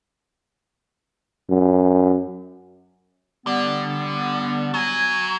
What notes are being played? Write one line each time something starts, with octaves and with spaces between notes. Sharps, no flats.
F#2
D3 G3 B3
F#3 G#5